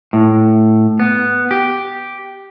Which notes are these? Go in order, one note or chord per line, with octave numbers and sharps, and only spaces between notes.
A2
B3
G4